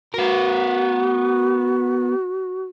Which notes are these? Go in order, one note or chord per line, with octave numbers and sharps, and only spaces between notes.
B3 F#4 A#4